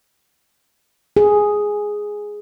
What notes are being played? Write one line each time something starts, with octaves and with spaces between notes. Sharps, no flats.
G#4